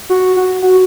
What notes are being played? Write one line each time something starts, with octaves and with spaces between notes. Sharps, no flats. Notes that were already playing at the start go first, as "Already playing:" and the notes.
F#4
F#4
F#4